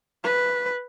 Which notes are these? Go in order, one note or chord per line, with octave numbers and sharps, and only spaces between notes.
B4